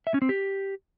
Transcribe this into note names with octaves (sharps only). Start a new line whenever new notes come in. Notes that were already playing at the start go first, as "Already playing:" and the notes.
E5
C#4
C4
G4